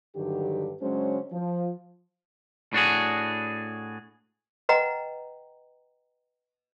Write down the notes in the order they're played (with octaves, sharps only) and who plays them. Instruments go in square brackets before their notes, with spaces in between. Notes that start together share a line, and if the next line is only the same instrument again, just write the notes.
[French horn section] G2 D3 D#3 F#3 G4
C#3 F#3 G#3 C#4 D4 C5
F3
[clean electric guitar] A2 D4 F#4 G#4
[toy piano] B4 D#5 F#5 G5 A#5